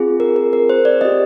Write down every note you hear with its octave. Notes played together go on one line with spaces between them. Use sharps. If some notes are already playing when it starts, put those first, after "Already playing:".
Already playing: C4 F4 G#4
A#4
A#4
A#4
C5
D5
C4 G4 D#5